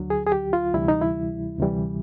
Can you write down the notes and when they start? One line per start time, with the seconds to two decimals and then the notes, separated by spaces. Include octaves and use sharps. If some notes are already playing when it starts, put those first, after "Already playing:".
Already playing: D2 D3 F#3
0.10 G#4
0.26 G#4
0.32 G4
0.53 F4
0.74 D2 C3 E3 G3 E4
0.88 D#4
1.02 E4
1.59 D2 C3 E3 G3